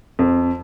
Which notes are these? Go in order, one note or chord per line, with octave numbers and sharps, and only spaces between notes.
F2